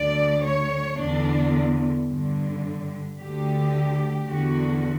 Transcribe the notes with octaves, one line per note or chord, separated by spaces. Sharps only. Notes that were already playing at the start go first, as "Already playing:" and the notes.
Already playing: D2 D3 D5
C#5
E2 D3 D4
G2 D3
D2 D3 G4
E2 D3 F#4